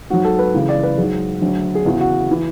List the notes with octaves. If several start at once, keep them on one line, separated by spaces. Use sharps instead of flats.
G#2 F#3 F#4
A4
B4
C#2 C#3 E3
D5
B4
G#2 F#3 G#4
D2 D3 F#3
G#4
E2 C#3 E3 F#4
F#4
E3